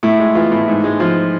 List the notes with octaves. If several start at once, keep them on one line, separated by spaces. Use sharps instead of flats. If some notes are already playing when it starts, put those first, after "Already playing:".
A2 E4
G#3
E3 F4
A2
G#2
G#3
F3 F4